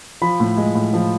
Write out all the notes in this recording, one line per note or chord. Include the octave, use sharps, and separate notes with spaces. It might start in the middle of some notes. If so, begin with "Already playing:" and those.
F3 B5
A2
G#3
A2
F3